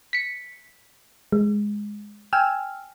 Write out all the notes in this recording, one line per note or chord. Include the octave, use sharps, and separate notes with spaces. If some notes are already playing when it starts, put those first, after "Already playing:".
B6 C#7
G#3
G5 G#5 E6 F6